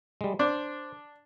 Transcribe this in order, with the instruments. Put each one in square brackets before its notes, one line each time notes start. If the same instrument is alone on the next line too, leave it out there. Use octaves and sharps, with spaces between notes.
[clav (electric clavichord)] G3 G#3
[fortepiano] D4 [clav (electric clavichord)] C5